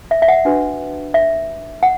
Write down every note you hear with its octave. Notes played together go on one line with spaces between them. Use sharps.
E5
E5
F#5
D4 F#4 B4
E5
F#5